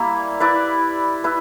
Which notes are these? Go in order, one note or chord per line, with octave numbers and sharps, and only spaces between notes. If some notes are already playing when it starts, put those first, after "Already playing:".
Already playing: G3 A#3 E4
E4 B4 D5
E4 B4